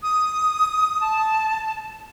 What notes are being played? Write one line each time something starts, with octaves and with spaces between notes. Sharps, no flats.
D#6
A5